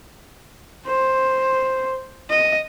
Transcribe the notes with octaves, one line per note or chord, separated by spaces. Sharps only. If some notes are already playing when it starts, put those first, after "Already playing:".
C5
D#5